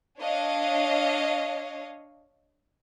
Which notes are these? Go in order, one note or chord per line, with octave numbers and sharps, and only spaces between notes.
D4 C#5 D#5 F5